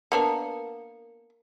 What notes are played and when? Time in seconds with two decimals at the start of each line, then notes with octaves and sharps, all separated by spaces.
0.12 A#3 B3 D4 A#4 C#7